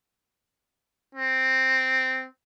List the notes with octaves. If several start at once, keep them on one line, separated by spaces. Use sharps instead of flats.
C4